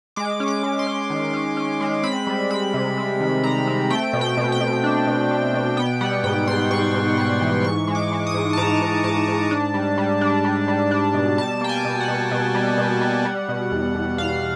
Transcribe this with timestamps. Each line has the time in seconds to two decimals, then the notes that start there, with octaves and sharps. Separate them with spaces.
0.16 G#3 D6
0.40 C#4
0.48 D6
0.63 G#3
0.79 C6
0.87 C#4
1.10 D#3
1.33 C#4
1.57 C#4
1.80 G#3
2.03 C4 B5
2.27 G3
2.50 C4 B5
2.74 C3
2.97 C4
3.20 D#3
3.44 C4 A#5
3.67 C4
3.90 A3 G5
4.13 B2
4.21 G5
4.37 B2
4.52 G5
4.60 B2
4.84 D4
5.07 B2
5.31 A3
5.54 B2
5.77 B3 G5
6.01 G3 F#5
6.24 G#2 G5
6.47 G#2 C6
6.70 G#2 C#6
6.94 G#2
7.17 G3 C#6
7.41 E3
7.64 G#2 C#6
7.87 G#3
7.95 D6
8.11 G#3
8.27 D#6
8.34 G#2
8.53 A5
8.57 G#2 A#5
8.82 G#2
9.04 G#2 A5
9.28 G#2
9.51 D4
9.74 G3
9.98 G3
10.21 D4
10.45 G3
10.68 G3
10.91 D4
11.14 B2
11.38 G3 A5
11.61 A#3 G5
11.69 G#5
11.85 B2
12.00 F#5
12.08 B2
12.31 B2
12.55 G3
12.78 B2
13.01 G3
13.25 G3
13.49 B2
13.72 E2
13.95 E2
14.18 E2 F5